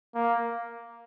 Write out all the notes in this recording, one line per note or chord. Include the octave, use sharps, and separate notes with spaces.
A#3